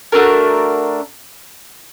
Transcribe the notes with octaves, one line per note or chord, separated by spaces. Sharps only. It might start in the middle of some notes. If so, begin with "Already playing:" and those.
A3 D4 F#4 A#4